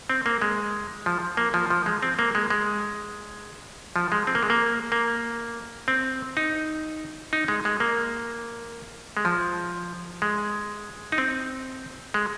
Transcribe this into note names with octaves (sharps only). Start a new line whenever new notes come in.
C4
A#3
G#3
F3
A#3
F3
F3
G#3
C4
A#3
G#3
G#3
F3
G#3
C4
A#3
G#3
A#3
A#3
C4
D#4
D#4
G#3
G#3
A#3
G#3
F3
G#3
D#4
C4
G#3